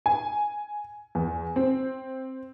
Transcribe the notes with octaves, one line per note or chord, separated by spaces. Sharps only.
G#5
E2
C4